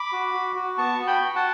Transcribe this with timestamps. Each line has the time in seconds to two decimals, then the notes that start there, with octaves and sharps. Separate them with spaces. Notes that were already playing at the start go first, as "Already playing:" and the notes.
Already playing: B5 D6
0.12 F#4
0.34 F#4
0.56 F#4
0.78 B3 A5 C#6
1.00 F#4
1.07 G5 B5
1.21 F#4
1.36 F#5 A5